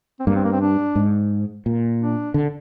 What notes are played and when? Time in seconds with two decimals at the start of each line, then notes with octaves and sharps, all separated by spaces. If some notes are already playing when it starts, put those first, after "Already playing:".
0.20 C4
0.27 G2 A#3
0.35 C4
0.44 A#3
0.52 C4
0.61 D4
0.96 G#2
1.66 A#2
2.00 D4
2.34 D3